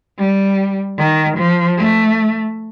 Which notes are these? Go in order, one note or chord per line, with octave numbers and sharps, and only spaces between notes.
G3
D#3
F3
A3